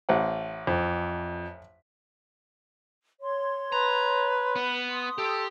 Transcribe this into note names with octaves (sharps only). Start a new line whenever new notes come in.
A1 C5 F#5
F2
C#5 C6
B4 A#5
B3
C6 D#6
G4 A4